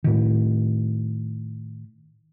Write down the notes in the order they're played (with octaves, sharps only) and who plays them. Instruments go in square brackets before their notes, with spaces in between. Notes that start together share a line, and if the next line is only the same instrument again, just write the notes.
[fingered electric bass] A2 D#3